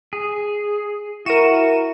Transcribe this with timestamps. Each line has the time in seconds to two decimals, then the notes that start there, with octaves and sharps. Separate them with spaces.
0.13 G#4
1.26 E4 F#4 A#4 D#7 E7